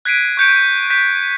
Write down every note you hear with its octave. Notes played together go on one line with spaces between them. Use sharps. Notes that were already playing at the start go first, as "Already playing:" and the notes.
F#6 G#6 B6 C7 D7 D#7
C#6 G6 C#7 D7
F#6 G6 B6